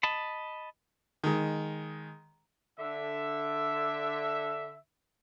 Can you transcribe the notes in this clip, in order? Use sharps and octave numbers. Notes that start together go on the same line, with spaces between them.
D#5 A5 B5
D#3 G#3
D3 E5